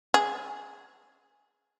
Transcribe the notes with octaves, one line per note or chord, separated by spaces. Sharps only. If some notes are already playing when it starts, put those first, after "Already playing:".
G#4